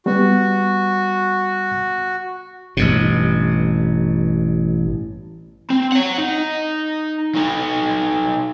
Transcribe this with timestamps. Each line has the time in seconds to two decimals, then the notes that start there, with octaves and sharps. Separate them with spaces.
0.06 G3 B3 F#4
2.77 A1 G2 B2
5.70 C4
5.92 C#5 F#5
6.18 D#4
7.35 F#3 D#4